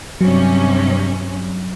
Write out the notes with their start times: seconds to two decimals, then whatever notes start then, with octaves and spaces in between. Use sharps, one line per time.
0.21 G2 C3 F#3 C#4